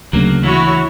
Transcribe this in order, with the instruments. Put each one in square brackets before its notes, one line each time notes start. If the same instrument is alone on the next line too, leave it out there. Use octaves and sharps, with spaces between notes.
[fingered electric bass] D2 C#3 [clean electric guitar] F#3 A#3
[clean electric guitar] E3 [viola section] E4 F#4 C#5